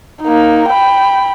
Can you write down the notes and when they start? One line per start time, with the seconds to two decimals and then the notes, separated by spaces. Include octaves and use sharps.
0.22 A#3 D#4
0.69 G5 B5